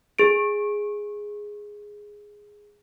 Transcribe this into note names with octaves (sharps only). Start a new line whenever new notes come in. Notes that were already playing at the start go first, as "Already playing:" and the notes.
G#4 D7